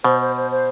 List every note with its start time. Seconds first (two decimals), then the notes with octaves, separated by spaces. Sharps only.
0.04 B2 C5
0.19 C5
0.34 C5
0.50 C5